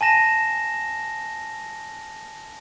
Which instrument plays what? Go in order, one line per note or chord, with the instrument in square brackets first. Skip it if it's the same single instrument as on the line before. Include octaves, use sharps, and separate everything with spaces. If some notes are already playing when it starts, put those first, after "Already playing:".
[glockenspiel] G#5 A5 A#6 E7